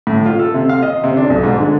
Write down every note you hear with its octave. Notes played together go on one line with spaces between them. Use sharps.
A2
F4
A4
C3
F5
D#5
C3
D4
B1
G#2
D3